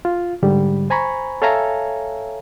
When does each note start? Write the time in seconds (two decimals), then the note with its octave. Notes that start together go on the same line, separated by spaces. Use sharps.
0.05 F4
0.43 G#2 D3 G3
0.90 C5 G#5 A#5 B5 C#6
1.42 A4 C#5 E5 F5 G#5 A#5